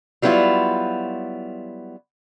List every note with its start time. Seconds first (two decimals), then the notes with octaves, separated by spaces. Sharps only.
0.22 F#3 G3 B3 E4 F4